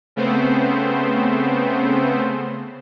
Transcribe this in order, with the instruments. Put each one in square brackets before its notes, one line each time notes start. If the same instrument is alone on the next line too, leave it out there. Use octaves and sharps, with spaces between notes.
[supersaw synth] C#3 A3 B3 C4 C5